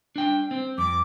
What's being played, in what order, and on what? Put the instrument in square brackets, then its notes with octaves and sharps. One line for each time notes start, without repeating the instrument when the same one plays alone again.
[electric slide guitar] D4 G5
C4
[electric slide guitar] F2 [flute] D6